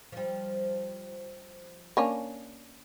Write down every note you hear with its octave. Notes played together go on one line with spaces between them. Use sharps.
F3 G3
A#3 C#4 D4